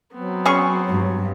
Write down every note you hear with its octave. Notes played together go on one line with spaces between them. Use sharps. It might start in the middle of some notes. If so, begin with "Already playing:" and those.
F#3 B3 C4
C#4 G#4 C#6
G2